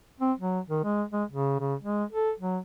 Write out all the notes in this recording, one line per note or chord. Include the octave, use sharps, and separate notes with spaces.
C4
F#3
D#3
G#3
G#3
C#3
C#3
G#3
A4
F#3